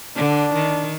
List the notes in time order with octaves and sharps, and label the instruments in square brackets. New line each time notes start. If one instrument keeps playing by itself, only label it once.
[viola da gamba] D3 [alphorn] D4
[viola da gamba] D#3